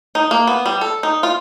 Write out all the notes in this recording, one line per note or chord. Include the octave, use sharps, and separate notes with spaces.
D#4
A#3
B3
G3
A4
D#4
F4